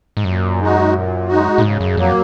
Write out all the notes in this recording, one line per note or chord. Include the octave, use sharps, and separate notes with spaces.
G#2
F#2 A#2
G#3 D#4 F#4
A#2
G#3 D#4 F#4
A#2
G#2 C#3
F#2
F2 F#3 A#3